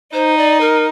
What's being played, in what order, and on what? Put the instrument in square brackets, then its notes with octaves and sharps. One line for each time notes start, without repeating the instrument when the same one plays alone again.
[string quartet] D#4 [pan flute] C5
[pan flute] D5
A#4